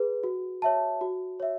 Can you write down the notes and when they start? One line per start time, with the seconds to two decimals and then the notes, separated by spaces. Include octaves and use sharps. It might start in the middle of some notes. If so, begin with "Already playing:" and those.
Already playing: G#4 B4
0.24 F#4
0.62 C#5 E5 A5
1.01 F#4
1.40 C#5 E5